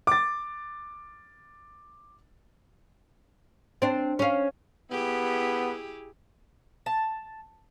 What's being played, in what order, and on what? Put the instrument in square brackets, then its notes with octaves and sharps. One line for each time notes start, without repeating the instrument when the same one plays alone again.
[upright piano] D6 A6
[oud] C4 D4
C#4 F5
[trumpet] B3 [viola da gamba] E4 G4 G#4
[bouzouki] A5